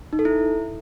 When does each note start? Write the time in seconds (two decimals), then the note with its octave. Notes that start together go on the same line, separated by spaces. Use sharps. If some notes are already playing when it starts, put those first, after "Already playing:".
0.13 D#4
0.19 A4
0.25 E4